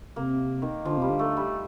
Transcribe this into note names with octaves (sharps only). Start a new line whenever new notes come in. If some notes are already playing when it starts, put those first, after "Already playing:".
C3 A#3
D#3
D3 F3
C3 G3
D3
A3
G3